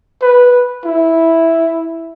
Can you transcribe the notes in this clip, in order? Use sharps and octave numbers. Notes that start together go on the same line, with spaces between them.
B4
E4